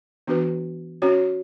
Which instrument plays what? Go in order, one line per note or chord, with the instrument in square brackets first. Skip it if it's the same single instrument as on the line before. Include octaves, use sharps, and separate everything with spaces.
[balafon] E3 B3 D4 F#4 B4
C#4 F#4 C#5